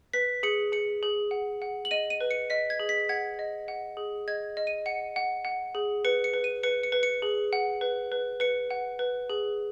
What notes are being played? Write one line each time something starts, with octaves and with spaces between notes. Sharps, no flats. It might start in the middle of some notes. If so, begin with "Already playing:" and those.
B4 B6
G#4 C#7
G#4 C#7
G#4
F#5
F#5
F#7
D#5 D#7
D#7
B4
C#7
D#5 B6
G#6
G#4
B6
F#5 G#6
D#5
F#5
G#4
D#5 G#6
D#5
D#7
F#5 C#7
F#5
F#5
G#4
B4 C#7
C#7
B4
D#7
B4 C#7
C#7
B4
C#7
G#4
F#5
B4
B4
B4 C#7
F#5
B4
G#4